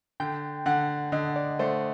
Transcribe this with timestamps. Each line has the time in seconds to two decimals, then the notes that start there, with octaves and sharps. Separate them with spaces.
0.20 D3 G5
0.66 D3 F#5
1.12 D3 D#5
1.36 D5
1.59 A3 C5